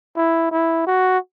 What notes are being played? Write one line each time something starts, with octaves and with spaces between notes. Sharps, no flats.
E4
E4
F#4